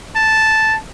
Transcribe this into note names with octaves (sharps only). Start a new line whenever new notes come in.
A5